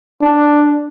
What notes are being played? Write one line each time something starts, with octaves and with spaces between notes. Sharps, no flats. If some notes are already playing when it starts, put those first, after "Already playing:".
D4